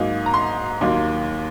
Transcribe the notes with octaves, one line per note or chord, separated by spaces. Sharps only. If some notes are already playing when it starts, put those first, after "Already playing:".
Already playing: G#2 F#3 A#3 D#4
A#5
C6
D#2 D#3 F#3 A#3